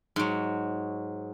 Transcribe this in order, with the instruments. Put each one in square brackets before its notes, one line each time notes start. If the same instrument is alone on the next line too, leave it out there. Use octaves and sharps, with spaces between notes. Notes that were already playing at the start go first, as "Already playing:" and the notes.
[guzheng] G#2 F#3